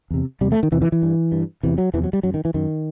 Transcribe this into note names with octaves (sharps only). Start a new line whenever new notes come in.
E2 C3
E2 C3 G3
A3
D#3
E2 C3 E3
E3
E3
G2
G2
E2 C3 E3
F#3
E2 C3 E3
F#3
G3
F#2 F#3
D#3
E3
F#2 D#3